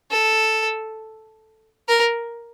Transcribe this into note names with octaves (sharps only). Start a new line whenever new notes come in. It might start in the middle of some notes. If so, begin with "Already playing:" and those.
A4
A#4